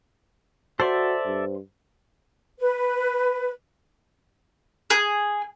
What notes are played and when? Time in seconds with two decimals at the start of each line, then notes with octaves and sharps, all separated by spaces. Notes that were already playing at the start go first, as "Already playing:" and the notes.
0.80 F#4 A4 C5 D5 E5
1.26 G2
2.60 B4
4.90 G#4